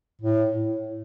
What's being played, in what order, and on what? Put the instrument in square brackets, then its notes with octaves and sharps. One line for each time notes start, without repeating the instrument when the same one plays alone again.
[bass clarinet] A2